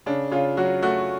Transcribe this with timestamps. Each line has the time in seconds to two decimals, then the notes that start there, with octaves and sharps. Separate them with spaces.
0.06 C#3 D4
0.31 C#3 F4
0.57 F#3 F#4
0.82 A3 F#4